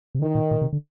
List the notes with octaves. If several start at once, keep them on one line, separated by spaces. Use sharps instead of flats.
C3
D3 D#3
A#2
A#2
C3
D3